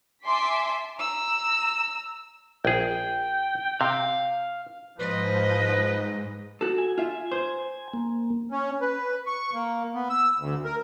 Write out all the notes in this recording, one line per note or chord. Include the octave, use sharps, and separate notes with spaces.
E5 G#5 A5 C6 D6 B6
A#5 E6
A#1 G#4 G5
C3 F5
G#2 F3 B4 D#5
F#4 A4
G#5
F4 E5
C5
A#3
C#4
B4
C#6
A#3
B3
E6
D2
A#4